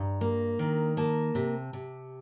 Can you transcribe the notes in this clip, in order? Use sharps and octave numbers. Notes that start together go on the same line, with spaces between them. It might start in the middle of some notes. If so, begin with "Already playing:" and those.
Already playing: G2 A#5
A#3
D#3
A#3 A5
C3
C3